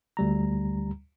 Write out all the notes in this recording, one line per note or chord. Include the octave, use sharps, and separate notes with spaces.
D2 G3 A#5